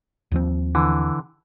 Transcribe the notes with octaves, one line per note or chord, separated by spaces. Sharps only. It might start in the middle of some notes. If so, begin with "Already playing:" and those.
D#2 F3 C4
D3 E3